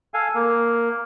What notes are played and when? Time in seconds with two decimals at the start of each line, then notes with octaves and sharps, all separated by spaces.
0.14 A4 F5 G#5
0.35 A#3